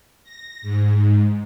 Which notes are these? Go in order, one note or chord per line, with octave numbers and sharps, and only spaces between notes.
A#6
G#2